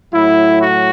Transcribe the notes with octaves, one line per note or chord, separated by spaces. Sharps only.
A2 F#3 E4
F#4